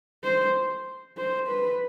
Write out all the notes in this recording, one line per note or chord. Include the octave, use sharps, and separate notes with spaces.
C5
C5
B4